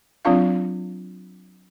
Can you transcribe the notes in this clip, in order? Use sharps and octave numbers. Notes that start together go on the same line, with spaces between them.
F#3 C4 D4 F4 F5